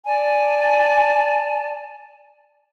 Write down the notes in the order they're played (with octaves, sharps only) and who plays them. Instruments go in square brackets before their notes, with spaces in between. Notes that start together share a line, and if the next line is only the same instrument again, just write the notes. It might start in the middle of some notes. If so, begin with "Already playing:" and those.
[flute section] D5 G#5 A5